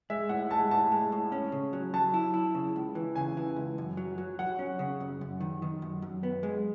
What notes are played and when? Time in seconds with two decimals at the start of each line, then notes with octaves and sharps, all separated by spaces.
0.10 G#3 E5
0.29 A2 F#5
0.50 G#3 A5
0.71 A2 A5
0.92 G#3
1.12 A2
1.32 C#4
1.52 C#3
1.73 F#3
1.94 F#3 A5
2.14 E4
2.34 E4
2.55 C#3
2.76 C#2
2.95 E3
3.16 C#3 G#5
3.37 E3
3.56 C#2
3.78 F#2
3.97 F#3
4.18 F#3
4.39 F#3 F#5
4.59 C#4
4.79 C#3
5.00 F#2
5.21 F#2
5.40 D#3
5.62 D#3
5.82 F#2
6.02 F#2
6.23 B3
6.43 G#3